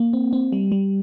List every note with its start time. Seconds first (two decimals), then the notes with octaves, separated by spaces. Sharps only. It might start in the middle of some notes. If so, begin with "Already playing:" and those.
Already playing: A#3
0.13 C4
0.33 C4
0.52 G3
0.72 G3